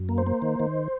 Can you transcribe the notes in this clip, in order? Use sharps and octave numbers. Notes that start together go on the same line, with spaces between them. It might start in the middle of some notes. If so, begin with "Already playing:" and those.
Already playing: F#2
A#3
C5
A#3
D#3
D#3